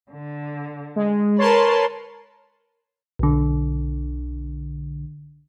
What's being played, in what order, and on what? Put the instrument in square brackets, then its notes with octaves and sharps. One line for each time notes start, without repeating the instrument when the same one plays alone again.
[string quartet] D3
[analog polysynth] G#3
[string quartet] A#4 B4 [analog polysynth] C#5 A5 C6
[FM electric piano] B1 D3